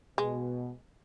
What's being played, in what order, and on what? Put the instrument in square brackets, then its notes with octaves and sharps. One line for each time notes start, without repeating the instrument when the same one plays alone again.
[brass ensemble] B2 [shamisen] G#3